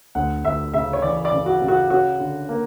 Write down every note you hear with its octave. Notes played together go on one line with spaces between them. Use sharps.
D2 F#5
D2 E5
C#3 E5
C#5
E3 D5
D5
C#3
F#4
C#3
F#4
C#4 F#4
D3
A#3